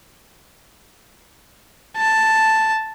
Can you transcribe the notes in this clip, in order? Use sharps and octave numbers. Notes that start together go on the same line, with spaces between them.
A5